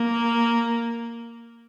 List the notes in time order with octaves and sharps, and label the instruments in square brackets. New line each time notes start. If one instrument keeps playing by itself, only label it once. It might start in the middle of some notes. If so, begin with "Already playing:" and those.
Already playing: [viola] A#3